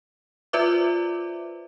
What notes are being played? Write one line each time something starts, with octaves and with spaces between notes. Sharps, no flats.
F4 B4 C5 D5 E5 D6